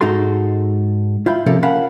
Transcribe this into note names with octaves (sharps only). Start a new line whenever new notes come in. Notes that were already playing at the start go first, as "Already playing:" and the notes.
G#2 D#4 F#4 A4 C6
E4 F4 G5 B5
C3 F3 A#3 C#4 G4 A4
C#4 A#4 F5 F#5 A5 B5